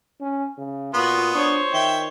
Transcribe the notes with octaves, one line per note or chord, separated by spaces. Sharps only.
C#4
C#3
A#2 B3 F4 F#4 C6 D#6
D4 C5 C#5
D#3 E5 G5